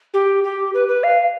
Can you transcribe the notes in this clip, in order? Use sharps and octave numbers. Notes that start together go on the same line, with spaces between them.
G4
G4
B4
B4
F5